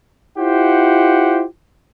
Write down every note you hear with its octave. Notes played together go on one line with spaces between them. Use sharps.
E4 F4 G4 C5 F#5